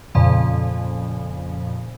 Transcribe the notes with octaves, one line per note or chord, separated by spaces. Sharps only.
F2 A#2 C#3 F3